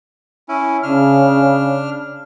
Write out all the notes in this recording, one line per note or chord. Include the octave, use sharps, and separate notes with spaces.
C#4 E4
C#3 D4 F6